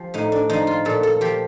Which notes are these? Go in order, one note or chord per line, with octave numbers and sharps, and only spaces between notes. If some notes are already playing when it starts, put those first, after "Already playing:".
Already playing: F3 G4
A2 D#4
D4
F3 D#4
F4
A#2 A4
A4
F3 G4